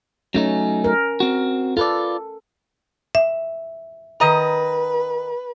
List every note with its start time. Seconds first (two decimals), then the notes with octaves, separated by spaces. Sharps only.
0.34 F#3 A3 C#4 D#4
0.84 A#4
1.20 C4 F#4
1.77 F4 A4 B4 D5
3.15 E5
4.20 D#3 B4 D#5 A#5